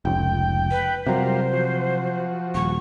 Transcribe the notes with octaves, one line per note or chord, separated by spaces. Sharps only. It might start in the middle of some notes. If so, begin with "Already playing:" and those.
F1 C#2 G5
B4
C3 F#3 G3 F4 A#4 C5
F3 F#4
D#1 C#6